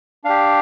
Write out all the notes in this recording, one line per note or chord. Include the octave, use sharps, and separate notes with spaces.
D4 G4 F5